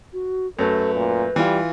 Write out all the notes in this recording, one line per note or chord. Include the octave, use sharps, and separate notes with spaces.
F#4
F#2 A3 A4 B4
A#2
E3 G3 F4